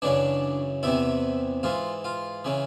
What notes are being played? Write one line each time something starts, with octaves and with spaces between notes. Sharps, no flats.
F#2 C#3 E3 D4
E2 C3 E3 E4
G#2 E3 F4
F4
C#3 E3